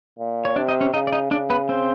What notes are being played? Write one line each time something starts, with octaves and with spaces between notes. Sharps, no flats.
A#2
C#5
C3 D4 D5
D#4 D#5
C#4 C#5
C#3 D#4 D#5
D5
D#4 D#5
C#3 D4 D5
B3 B4
C4 C5